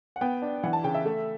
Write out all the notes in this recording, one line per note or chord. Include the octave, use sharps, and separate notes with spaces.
F#5
B3 G5
D4
E3 F#5
A5
C#3 G5
E5
A3